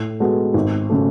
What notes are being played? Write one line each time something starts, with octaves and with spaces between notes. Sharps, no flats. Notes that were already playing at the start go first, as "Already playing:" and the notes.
Already playing: A2
G#3 B3 F#4 A4
G#1
C#3 F#3 A3